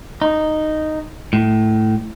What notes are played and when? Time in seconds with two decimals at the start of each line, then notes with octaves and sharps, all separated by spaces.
0.22 D#4
1.33 A2